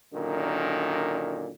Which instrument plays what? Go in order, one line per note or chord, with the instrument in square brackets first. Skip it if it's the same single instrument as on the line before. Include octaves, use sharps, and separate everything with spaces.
[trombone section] F#2 A#2 D3 D#3